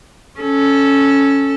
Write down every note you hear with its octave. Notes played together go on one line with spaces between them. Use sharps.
C#4 A4